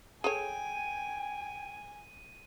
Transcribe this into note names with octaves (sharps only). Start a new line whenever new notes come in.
G#4 A4 C#5 G5 G#5 D#7